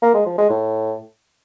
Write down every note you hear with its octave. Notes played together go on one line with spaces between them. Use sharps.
A#3
G#3
F3
G#3
A2